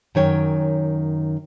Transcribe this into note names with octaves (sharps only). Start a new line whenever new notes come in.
F#2 D#3 C#5 G5